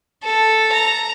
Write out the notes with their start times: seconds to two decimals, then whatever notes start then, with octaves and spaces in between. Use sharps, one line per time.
0.23 A4
0.72 A#5